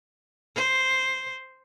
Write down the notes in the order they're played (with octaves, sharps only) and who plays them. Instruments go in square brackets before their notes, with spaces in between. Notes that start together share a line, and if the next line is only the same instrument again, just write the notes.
[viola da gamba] C5